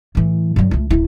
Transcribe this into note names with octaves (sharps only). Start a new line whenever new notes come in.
A2 E3
G2 F#3
C#2 A3
D1 E4